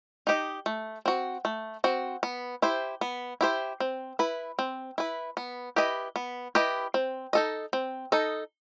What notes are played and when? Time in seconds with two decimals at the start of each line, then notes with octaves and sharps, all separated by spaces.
0.27 D#4 G4 D#5
0.66 A3
1.05 C4 F#4
1.45 A3
1.84 C4 F#4
2.23 B3
2.62 E4 G4 C5
3.01 B3
3.41 E4 G4 C5
3.80 C4
4.19 E4 B4
4.59 C4
4.98 E4 B4
5.37 B3
5.76 E4 G4 B4 D#5
6.16 B3
6.55 E4 G4 B4 D#5
6.94 C4
7.33 D#4 A4 D#5
7.73 C4
8.12 D#4 A4 D#5